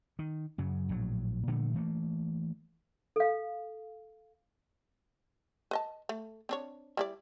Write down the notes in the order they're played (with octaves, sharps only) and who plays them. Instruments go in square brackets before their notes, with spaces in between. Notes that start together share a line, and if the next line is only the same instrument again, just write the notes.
[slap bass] D#3
F#2 C#3 F#3
A#1 A2 F#3
A#2 D3 F3 A3
E3 A3 A#3
[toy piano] A4 F5
[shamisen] B4 D#5 A5
A3
C4 D4 C#5
G3 E4 D5